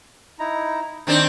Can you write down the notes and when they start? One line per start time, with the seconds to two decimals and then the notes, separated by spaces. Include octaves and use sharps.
0.39 D#4 E4 A#5
1.07 D#3 C4 D4 A#5